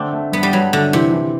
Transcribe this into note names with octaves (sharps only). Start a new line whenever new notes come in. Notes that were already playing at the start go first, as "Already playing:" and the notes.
Already playing: D3 A3 C4 D4
A3
G2 B3
G3
G2 F#3
D3 A3
C3 E3
E3